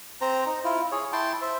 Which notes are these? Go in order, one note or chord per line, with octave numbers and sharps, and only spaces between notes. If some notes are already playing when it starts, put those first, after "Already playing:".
C4 C5 A#5
D#4
E4 F4
G#4 C#5
E4 G5 A5 C6
C5 E5